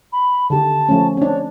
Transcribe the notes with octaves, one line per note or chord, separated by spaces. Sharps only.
B5
D3 D#3 G4 A5
F3 A3 C#4
C4 D4 C#5